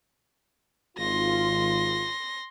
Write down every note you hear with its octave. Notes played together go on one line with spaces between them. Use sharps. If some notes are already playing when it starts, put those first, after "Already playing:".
G#1 F4 C6 A#6